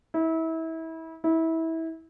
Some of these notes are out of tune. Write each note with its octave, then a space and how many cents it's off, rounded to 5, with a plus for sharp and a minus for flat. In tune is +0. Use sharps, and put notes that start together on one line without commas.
E4 -30
E4 -25